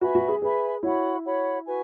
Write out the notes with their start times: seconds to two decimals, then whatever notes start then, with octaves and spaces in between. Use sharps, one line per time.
0.01 F#4 B4 E5 G#5 B5
0.15 F#4
0.28 G#4
0.42 G#4 B4 E5 G#5 B5
0.83 E4 F#4 C#5 F#5 B5
1.24 F#4 C#5 F#5 B5
1.66 F#4 B4 G#5